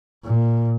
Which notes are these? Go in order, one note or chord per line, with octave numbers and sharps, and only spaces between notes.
A#2